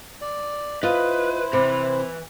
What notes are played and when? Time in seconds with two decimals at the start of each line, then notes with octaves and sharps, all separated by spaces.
0.21 D5
0.83 E4 F4 B4 C5 D#5
1.53 C3 E3 B5